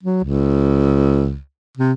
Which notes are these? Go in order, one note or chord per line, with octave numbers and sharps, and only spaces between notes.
F#3
C#2
C3